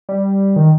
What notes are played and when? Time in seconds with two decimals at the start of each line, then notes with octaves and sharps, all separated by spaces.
0.09 G3
0.56 D#3